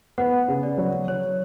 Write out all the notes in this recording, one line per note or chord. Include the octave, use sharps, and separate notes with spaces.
B3 F#5
C#3
D5
F#3
F#3 C#5